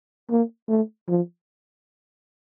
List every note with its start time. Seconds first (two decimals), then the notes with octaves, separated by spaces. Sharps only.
0.30 A#3
0.69 A3
1.08 F3